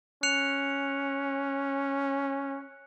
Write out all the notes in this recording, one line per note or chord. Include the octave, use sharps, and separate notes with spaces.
C#4 F#6 C#7 F7